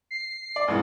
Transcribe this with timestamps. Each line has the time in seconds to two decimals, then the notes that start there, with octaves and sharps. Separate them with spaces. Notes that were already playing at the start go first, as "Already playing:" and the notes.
0.11 C7
0.56 D5
0.68 C2 G#2 E3